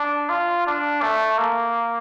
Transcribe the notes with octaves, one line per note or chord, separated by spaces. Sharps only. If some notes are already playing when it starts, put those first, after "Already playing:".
Already playing: D4
F4
D4
A3
A#3